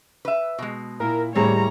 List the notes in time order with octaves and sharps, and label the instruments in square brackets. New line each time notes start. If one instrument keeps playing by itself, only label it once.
[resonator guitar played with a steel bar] B4 E5
B2 G#3
[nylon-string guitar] A#2 [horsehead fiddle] E4 [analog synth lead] A#4
[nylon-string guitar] D#2 A2 G#4 [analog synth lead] G3 [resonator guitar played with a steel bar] C4 [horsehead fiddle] C#5 A#5